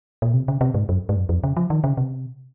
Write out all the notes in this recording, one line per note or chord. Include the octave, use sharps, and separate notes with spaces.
A#2
C3
C#3
C3
G#2
F#2
G#2
F#2
F2
C#3
F3
D#3
C#3
C3